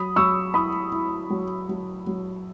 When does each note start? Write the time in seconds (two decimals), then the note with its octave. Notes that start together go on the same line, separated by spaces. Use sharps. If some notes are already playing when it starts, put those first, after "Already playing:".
Already playing: F#3 B5 D#6
0.16 F#3 C#6 E6
0.54 E4 B5 D#6
0.92 E4
1.30 F#3
1.69 F#3
2.07 F#3